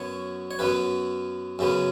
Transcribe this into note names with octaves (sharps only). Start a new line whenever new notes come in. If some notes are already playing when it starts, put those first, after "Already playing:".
Already playing: F#2 F#3 B3 C#5
C#5
F#2 F#3 B3 B4
F#2 C#3 F#3 B3